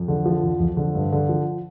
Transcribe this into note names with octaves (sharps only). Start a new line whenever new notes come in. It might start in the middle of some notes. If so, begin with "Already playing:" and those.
Already playing: F2
D3
F3
F2
F2
D3
G2
D3
F3